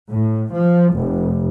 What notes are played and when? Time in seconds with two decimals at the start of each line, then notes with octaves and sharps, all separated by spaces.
0.10 A2
0.53 F3
0.94 F1